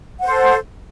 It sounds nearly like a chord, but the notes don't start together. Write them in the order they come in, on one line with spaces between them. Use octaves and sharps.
F#5 C5 A4